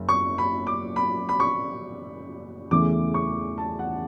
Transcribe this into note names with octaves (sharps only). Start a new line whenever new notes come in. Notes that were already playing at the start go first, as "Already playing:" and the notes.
Already playing: F#1
C#6
B5
D6
B5
B5
C#6
E2 C#3 E3 A3 D6
C#6
A5
F#5